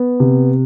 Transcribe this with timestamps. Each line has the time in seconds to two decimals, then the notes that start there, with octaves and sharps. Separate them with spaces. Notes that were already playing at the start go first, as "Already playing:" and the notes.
Already playing: B3
0.20 C3